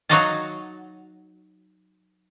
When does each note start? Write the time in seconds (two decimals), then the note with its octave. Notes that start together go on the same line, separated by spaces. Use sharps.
0.09 F#3 D#4 F#4 D#5 F5 A5